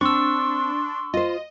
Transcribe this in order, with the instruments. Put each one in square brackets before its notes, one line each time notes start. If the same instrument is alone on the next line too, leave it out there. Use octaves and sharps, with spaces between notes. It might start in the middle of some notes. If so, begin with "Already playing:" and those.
[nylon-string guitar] C4 [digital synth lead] D4 [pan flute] C6 [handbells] C#6 E6
[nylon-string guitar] F4 C5 [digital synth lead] D#5